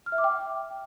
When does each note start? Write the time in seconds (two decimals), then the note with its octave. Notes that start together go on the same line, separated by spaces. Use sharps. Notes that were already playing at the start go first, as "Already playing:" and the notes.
0.06 F6
0.12 E5
0.18 D6
0.24 G5